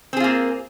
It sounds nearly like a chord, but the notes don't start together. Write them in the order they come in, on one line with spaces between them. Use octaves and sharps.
C4 G#4 F4 A#3